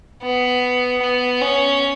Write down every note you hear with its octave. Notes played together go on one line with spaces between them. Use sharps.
B3
B3
C#4